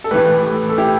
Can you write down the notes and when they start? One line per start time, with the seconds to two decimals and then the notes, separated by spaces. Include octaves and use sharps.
0.04 A4
0.11 A2 E3 A3 G4 B4
0.69 A4
0.78 E4 G4